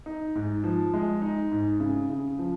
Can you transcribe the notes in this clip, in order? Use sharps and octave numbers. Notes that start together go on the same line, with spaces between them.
D#4
G#2
F3
G#3
D#4
G#2
C#3
C#3
F3